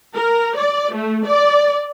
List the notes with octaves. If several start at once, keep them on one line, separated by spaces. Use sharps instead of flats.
A#4
D5
A3
D5